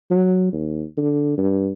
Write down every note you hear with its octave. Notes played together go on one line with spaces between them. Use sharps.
F#3
D#2
D3
G2